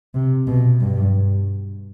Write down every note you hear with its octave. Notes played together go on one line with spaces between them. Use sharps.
C3
B2
G2